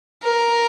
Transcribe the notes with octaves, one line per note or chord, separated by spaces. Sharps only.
A#4